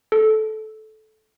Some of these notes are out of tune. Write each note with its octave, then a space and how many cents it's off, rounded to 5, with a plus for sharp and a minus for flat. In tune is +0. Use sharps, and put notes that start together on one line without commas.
A4 -15